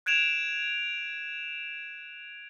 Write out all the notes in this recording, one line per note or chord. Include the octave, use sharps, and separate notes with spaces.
F#6 G#6 D7 E7 F7